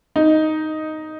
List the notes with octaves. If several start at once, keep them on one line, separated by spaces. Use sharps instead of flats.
D#4